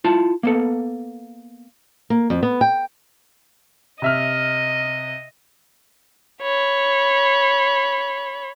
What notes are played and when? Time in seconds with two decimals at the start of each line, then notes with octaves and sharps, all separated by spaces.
0.04 E4 F4 A5
0.43 A#3 B3 A4
2.10 A#3
2.30 F2
2.43 B3
2.61 G5
4.02 C3 D#5 E5 F6
6.42 C#5 B5